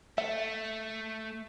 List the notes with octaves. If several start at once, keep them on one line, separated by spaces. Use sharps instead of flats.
A3 E5